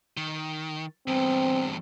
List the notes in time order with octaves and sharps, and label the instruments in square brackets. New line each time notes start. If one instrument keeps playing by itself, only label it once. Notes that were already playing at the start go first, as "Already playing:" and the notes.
[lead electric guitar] D#3
[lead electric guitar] E2 G2 [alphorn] C4